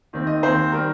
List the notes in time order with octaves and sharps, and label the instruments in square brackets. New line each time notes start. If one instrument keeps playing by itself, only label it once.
[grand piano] D#2 D#3 C4
D#5
D#2 D#3 C4 C5
D#3 G3 A#4